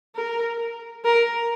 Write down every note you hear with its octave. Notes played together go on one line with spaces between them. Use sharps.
A#4
A#4